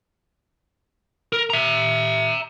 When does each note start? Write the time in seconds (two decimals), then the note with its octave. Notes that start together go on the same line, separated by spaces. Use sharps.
1.33 A#4
1.50 E5 A#5